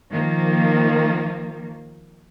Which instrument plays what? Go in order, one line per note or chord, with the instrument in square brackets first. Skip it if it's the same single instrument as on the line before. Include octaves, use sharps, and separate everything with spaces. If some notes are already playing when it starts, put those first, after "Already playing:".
[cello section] D#3 F3 A#3